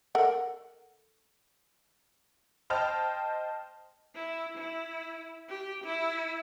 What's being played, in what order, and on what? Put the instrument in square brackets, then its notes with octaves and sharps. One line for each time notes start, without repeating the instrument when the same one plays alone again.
[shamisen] A4 A#4 F#5
[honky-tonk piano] C5 D#5 G5 A5 F6
[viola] E4
E4
G4
E4